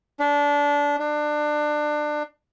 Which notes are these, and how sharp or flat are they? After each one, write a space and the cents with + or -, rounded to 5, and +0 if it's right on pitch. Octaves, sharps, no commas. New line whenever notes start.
D4 -20
D4 +25